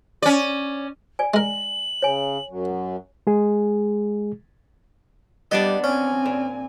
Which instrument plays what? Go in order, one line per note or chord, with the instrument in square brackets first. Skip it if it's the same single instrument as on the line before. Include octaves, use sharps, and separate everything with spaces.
[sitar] C#4 D5
[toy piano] D5 G#5
[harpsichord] G#3 A#4 [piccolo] F#7
[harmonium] C#3 [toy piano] C#5 G#5
[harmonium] F#2 F#3
[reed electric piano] G#3 G#4
[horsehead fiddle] G3 [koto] B3 D4 D5 [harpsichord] D#5
[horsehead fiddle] C4 G#5 [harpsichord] C#4
[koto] A#2